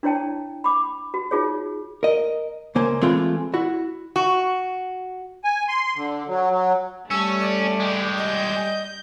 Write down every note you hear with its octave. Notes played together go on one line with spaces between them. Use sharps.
D4 E4 C#5 G5 A5
B5 D6
F#4
D#4 F4 G#4 C#5
A#4 D#5
C#2 A#3 C5 G#5
E3 G#3 A3 C4 F4
E4 F#4
F#4
G#5
C6
D3
F#3
F#3
G3 A3 C#4 E6
D5
G#3 G4
D#5 G6